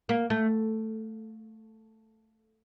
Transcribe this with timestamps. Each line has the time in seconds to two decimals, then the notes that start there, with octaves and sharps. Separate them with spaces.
0.09 A#3
0.30 A3